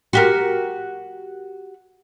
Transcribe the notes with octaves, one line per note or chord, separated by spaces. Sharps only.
F#4 G4 A#4